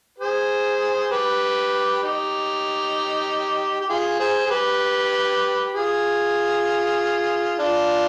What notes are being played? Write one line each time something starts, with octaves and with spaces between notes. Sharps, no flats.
G#4 C5
G4 B4
D#4 G4
G4
F4 G#4
G#4 C5
G#4
G4 B4
F4 G#4
D4 F4